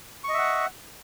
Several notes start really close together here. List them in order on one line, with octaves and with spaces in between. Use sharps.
C#6 D#5 E5 F#5